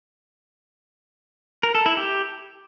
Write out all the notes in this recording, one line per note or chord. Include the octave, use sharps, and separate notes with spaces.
A#4
A4
E4
G4